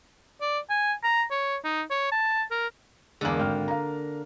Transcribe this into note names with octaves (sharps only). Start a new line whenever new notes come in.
D5
G#5
A#5
C#5
D#4
C#5
A5
A#4
E2 D3 G#3 A#3
G#1 G5 F6
F5 A#5